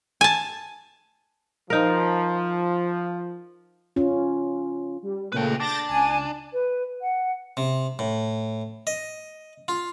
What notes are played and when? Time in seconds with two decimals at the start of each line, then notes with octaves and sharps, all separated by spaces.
0.21 G#5 A5
1.70 F3 D#4 A#4
3.96 C#4 F4
5.03 G3
5.32 A#2 C#3 A3 B4 G5
5.60 D4 G6 A6 A#6
5.89 C#2 G#5
6.53 B4
7.01 F#5
7.57 C3
7.99 A2
8.87 D#5
9.68 F4